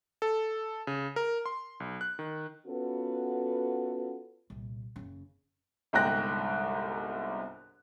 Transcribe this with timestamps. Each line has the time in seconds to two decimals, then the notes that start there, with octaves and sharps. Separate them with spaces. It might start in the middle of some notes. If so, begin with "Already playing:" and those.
0.22 A4
0.87 C#3
1.16 A#4
1.46 C6
1.80 B1
2.01 F#6
2.19 D#3
2.67 B3 C#4 F4 F#4 A4 B4
4.50 C2 A#2
4.96 F#1 C#3
5.93 G1 C2 G#2 G5 F#6 A#6